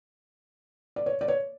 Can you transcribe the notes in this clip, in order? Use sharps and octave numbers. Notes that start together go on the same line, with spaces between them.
D5
C#5
D5
C#5